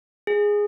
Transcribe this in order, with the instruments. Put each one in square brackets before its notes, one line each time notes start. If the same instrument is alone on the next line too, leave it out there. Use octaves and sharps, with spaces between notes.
[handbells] G#4